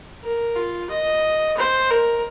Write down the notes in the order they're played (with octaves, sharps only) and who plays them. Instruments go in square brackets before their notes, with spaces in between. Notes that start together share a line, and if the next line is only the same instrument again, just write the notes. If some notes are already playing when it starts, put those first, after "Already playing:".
[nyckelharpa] A#4
F4
D#5
C5
A#4